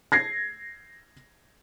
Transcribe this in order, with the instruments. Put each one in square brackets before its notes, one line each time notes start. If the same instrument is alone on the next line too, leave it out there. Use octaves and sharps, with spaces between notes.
[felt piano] G#6 A#6 C7